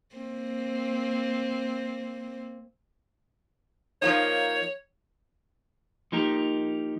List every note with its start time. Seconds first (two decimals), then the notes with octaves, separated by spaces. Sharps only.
0.15 A#3 C4
4.02 F3 A#3 D#4 C#5
6.12 F3 A#3 D#4 G4 A#4